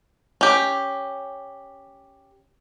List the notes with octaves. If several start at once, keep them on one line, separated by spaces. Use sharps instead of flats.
C#4 G4